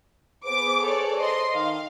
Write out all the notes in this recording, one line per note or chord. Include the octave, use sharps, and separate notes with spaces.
B3 G#4 B4 C5 D6
A4 C#5 D5
D#5 C6
D#3 F5